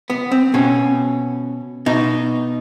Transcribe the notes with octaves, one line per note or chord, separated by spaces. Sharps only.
B3
C4
B2 C#4
B2 D#4